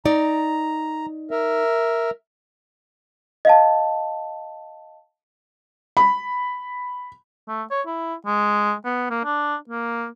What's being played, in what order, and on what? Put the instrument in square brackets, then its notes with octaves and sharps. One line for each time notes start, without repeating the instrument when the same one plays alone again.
[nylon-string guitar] D#4 D5 [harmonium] A#5
[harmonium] A#4 E5
[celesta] D#5 F5 A5
[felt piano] B5
[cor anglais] A3
C#5
E4
G#3
B3
A#3
D4
A#3